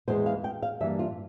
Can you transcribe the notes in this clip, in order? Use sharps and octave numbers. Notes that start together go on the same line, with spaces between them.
E2 E3 G#3 C5
F5
G5
F5
G2 E3 G3 A#3 E5
F4